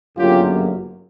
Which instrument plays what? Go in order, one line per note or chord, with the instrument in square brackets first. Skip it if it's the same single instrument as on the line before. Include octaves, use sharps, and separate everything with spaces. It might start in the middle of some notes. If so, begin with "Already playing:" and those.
[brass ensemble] G1 F#2 C#3 F#3 A#3 F4 G4